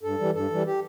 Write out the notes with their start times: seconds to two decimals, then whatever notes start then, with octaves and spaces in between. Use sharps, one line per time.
0.03 G2 A4
0.19 E3 G3
0.34 G2 A4
0.51 E3 G3
0.66 G4